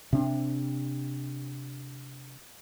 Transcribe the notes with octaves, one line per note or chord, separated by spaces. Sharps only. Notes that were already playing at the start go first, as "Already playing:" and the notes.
C3 D4